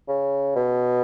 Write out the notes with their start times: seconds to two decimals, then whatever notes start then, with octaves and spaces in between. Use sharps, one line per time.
0.08 C#3
0.56 B2